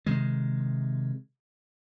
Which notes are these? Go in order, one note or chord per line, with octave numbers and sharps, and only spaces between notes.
C3 D#3 G#3